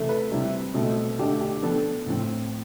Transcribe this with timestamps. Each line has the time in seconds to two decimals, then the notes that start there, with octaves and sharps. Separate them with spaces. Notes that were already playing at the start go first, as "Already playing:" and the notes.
Already playing: C3 E3 A3 E4 A4
0.09 B4
0.31 C3 G3 C4 E4
0.74 B2 A3 C4
1.19 D3 A3 D4 G4
1.41 G4
1.63 F3 B3 D4 A4
2.06 A2 F3 C4